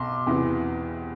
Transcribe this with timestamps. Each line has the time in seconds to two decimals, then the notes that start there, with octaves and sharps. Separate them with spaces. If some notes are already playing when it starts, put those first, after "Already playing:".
Already playing: B1 C6 D6
0.26 E2 C3 E3